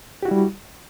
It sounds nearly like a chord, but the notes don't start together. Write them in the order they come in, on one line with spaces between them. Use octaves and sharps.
G4 F#4 E4 G3